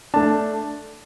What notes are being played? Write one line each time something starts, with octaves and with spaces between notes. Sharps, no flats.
A3 D4 A5